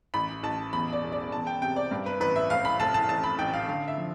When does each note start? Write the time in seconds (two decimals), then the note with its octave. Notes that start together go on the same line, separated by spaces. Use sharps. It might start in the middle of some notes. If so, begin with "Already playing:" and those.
0.14 A1 B5
0.43 A1 A5
0.73 E2 B5
0.93 D5
1.02 E1
1.12 D5
1.32 E2 A5
1.47 G5
1.61 C3 G5
1.76 D5
1.91 G2
2.06 B4
2.20 A1 B4
2.36 E5
2.50 F1 F5
2.65 B5
2.80 F1 A5
2.94 A5
3.09 A1 A5
3.24 B5
3.39 A1 G5
3.53 F5
3.68 D3 F5
3.88 E5
3.98 F3